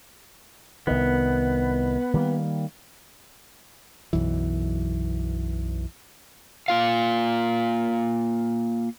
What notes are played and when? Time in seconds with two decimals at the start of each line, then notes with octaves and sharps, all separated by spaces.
0.87 C2 D#3 B3
2.14 D#3 G3 A#3
4.13 B1 F#2 E3
6.68 A#3 F4 F5